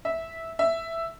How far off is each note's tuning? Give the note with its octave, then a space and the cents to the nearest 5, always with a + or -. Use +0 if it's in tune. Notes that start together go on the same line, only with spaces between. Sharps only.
E5 -10
E5 +5